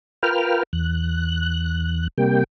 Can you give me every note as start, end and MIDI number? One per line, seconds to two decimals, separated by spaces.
0.23 0.63 65
0.23 0.63 70
0.23 0.63 71
0.23 0.63 79
0.23 0.63 89
0.73 2.08 40
0.73 2.08 90
2.18 2.44 48
2.18 2.44 55
2.18 2.44 58
2.18 2.44 79